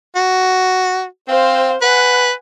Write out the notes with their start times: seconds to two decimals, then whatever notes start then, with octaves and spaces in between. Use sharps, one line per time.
0.16 F#4
1.28 C4 C5 F5
1.82 B4 F#5 G#5